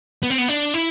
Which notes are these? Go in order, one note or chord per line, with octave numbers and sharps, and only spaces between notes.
B3
C4
B3
D4
E4